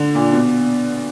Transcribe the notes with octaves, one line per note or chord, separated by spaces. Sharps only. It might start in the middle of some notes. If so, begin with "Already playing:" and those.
Already playing: D3
A#2
B2